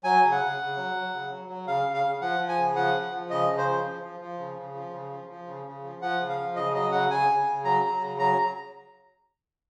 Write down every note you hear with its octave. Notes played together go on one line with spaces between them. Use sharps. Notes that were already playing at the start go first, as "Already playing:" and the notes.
F#3 G#5
C#3
F#5
C#3
C#3
F#3
F#3
C#3
F#3
F#3
C#3 F5
C#3
F5
C#3
F3 F#5
F3
G#5
C#3
F3 F#5
F3
F3
C#3 D#5
C#3
C5
F3
F3
F3
F3
C#3
C#3
F3
C#3
F3
F3
C#3
C#3
F3
F3 F#5
C#3
F5
F3
C#3 D#5
F#3 D#5
C#3 F#5
C#3 G#5
C#3
C#3
F#3 A#5
F#3
C#3
F#3 A#5